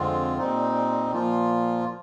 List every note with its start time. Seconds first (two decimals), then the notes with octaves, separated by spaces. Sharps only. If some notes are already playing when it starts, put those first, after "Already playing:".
Already playing: F2 D3 G#3 C4 F4
0.38 A#2 G3 C4 D#4
1.11 A#2 F3 A#3 F4